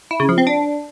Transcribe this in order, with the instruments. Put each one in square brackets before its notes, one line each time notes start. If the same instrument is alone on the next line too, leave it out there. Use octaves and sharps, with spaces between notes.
[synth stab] E4
C#3
F3
C4
D4